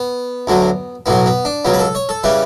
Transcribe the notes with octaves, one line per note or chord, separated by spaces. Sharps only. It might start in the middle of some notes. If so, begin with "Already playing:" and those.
Already playing: B3
D2 D3 F#3
B1 A2 F#3 B3
B3
D4
C#2 C#3 F#3 B3
B4
A4
C#5
A4
C#3 E3 G3 B4